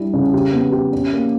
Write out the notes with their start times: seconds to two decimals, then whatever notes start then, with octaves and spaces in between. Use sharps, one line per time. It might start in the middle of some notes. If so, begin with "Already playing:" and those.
Already playing: G3 D4 E4
0.14 C#3
0.34 G4
0.53 B3
0.72 G4
0.93 C#4
1.13 A#3